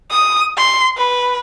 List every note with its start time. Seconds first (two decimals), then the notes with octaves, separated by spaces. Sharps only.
0.11 D#6
0.57 C6
0.97 B4